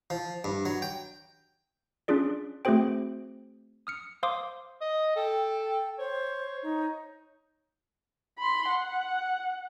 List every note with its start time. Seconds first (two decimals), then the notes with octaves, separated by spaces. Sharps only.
0.10 F3
0.44 G2
0.65 F#3
0.82 G5
2.08 C#4 D4 F4 G#4 D5
2.65 A3 C4 F#4 G#4 C5 G5
3.87 D#6 F6 C#7
4.23 C5 F5 C6 D6 D#6
4.81 D#5
5.16 A4 G5
5.99 C5 C#5
6.63 D#4
8.38 B5 C6
8.69 F#5